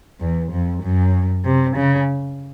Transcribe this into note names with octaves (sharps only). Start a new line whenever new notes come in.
E2
F2
F#2
C3
C#3